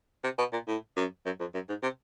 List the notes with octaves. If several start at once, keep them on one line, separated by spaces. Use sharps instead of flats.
C3
B2
A#2
A2
F#2
F#2
F2
F#2
G#2
C3